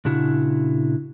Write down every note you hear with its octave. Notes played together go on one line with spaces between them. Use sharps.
A#2 C#3 D4 E4 F#4